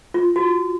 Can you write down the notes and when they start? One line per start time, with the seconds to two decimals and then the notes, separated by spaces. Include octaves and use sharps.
0.14 F4
0.36 F#4